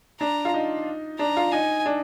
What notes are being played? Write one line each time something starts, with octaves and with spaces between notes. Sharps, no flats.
D4 A#5
F4
D#4
D4 A#5
F4
D#4 G#5
D4